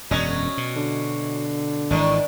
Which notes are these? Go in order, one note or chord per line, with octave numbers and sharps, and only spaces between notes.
E1 F#2 F#3 C#4 D#5
B2
D3
G#1 B2 D#3 E3 D4